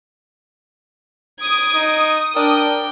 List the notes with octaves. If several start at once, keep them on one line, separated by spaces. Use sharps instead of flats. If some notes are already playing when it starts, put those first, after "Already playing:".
D#6 G#6 D7
D#4
D4 A#4 G5